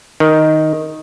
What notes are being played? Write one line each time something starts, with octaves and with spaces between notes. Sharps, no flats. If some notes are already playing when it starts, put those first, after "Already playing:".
D#3